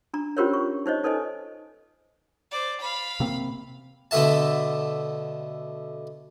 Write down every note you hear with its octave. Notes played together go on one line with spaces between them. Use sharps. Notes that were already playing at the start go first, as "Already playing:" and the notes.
D4 A#5
C#4 F4 G4 A#4 C5 C#5
C#6
D#4 C5 C#5 D#5
D#4 A4 B4 C5 D#5 G#5
C5 D5
F5 B5
C3 A#3 C4
B2 D3 A3 E5 A5